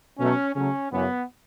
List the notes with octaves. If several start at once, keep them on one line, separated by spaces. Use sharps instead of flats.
B2 F#3 A3 C#4
C#3 F#3 A3 C#4
F#2 C#3 E3 B3